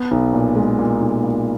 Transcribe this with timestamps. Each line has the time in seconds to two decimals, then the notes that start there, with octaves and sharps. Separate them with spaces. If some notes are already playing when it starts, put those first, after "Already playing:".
Already playing: B3
0.11 B1
0.33 A#2
0.56 G#3
0.79 A#2
1.01 B1
1.23 A#2